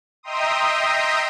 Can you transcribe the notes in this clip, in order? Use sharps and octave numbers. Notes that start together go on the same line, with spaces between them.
D#5 E5 G5 A#5 C6 D#6